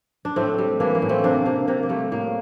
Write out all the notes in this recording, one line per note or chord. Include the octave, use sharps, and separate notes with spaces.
D4
A2 A3 C4
G3
E3 A#3 D4
A#3
A2
A3 C4
C3 A#3 D4
C3 A#3 D4
C3 A#3
A#3
G3 A3
A2 A#3